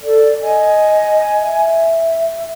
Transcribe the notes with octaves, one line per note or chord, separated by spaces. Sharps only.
A4 D5
D#5 G#5
E5